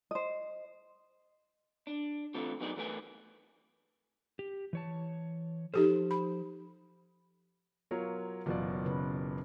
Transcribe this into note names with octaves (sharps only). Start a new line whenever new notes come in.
C5 D#5
D4
D2 E3 C4 F4 A4
F#3 B3 D#4 G#4 A#4 D5
E3 A3 F4 A#4 B4 G#5
G4
E3 C#5 A5
F3 D#4 G4 A4 C5
B5
F#3 B3 F4 A#4 C#5
F#1 B2 E3 F#3 F4 D5
C#3 B4